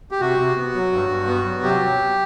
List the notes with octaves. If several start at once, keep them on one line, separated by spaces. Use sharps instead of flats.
G4
C3 F#4
C3
B3
F#3
G2
G2
B3
F#3
C3 G4